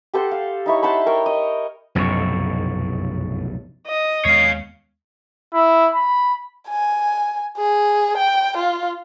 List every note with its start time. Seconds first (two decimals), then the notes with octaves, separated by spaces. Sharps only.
0.14 G4 A4 C5 F#5
0.31 F5
0.66 D#4 E4 C#5
0.83 C5 F#5 A5 B5
1.06 A#4 C#5 G5
1.26 D#5
1.95 F1 B1 F#2 A2 C#6
3.87 D#5
4.25 D#2 G#3 B3 C#5 F5 C7
5.54 E4
5.95 B5
6.68 G#5
7.57 G#4
8.18 G5
8.57 F4